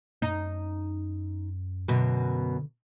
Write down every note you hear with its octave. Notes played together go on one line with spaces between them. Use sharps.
F#2 D#4
F#2 B2 D3